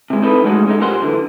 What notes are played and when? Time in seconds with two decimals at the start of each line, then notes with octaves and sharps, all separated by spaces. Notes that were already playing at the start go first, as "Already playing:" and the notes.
0.10 C3 G#3
0.22 C4 D#4 E4 A4 B4
0.44 F#3 G#3 A3 C#4 D#4 F#4
0.66 C#3 G#3 A3 D#4
0.80 A#2 G3 A#4 C5 F#5 C6
1.01 F#2 D3 E3